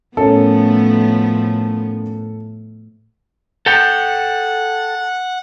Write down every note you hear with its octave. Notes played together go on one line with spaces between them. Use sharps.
A2 F3 A3 B3 C#4 A4 A#4 C#5
A4 F#5 G5